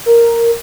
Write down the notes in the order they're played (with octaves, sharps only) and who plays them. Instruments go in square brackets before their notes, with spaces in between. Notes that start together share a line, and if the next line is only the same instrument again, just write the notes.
[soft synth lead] A#4